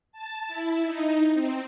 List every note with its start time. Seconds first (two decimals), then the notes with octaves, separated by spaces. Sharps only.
0.12 A5
0.48 E4
0.85 D#4
1.33 C4